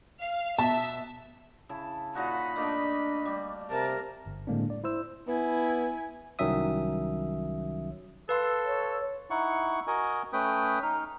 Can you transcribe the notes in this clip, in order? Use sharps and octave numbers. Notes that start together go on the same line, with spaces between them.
F5
B2 E5 A5
C#3 E4 A5
A#2 D#4 F#4 F#5 B5
A3 A#3 D4 D5 D#5
G3
C3 A#4 A5
G1
A2 D3 G#3 A#3 C4 D4
D5
E4 C5 E6
B3 E4 G#5
C2 D#3 F#3 C#4 E5 D#6
A4 B4 F5 C6
C#5
D#4 E4 F#5 C#6
F#4 A#4 D#5 G#5
A3 C#4 B4 G5 D#6
D#4 F6